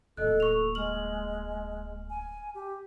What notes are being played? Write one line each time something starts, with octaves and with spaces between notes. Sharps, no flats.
D1 A#3 A4 D#5 F#6
C#6 F7
G#3 F6 F#7
G#5
G4